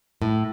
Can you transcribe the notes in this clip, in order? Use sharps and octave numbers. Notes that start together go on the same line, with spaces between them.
A2